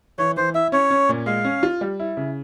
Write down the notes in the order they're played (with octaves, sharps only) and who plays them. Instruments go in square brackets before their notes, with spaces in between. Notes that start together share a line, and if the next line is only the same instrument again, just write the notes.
[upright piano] E3 [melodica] C#5
[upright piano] E3 [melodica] C5
[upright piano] E4 [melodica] E5
[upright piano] C#4 [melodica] C#5
[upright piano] C#4
A#2
[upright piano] G#3 [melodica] F5
[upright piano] C#4
F4
G3
E4
C#3